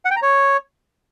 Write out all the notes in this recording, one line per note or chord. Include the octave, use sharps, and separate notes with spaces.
F#5
G5
A#5
C#5